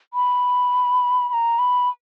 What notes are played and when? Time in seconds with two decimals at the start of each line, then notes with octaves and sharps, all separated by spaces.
0.14 B5
1.29 B5
1.33 A#5
1.59 B5